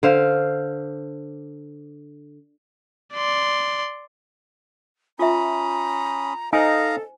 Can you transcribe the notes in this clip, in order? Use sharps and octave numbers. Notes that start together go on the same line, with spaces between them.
D3 C5 F5
D5 C6
C#4 F4 E5 A#5 B5 D#6
D#4 A4 C5 D#5 F5 G#5 A#5